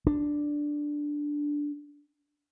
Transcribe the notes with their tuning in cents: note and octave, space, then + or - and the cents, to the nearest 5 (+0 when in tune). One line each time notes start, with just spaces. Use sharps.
D4 +0